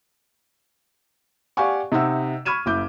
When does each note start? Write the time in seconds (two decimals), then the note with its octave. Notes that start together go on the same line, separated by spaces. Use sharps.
1.57 G4 D5 F5 F#5 G#5 C#6
1.92 C3 D#4 E5 F#5 E6
2.45 B5 C#6 F6 G#6 D#7 E7
2.66 F#1 E4 D6 G6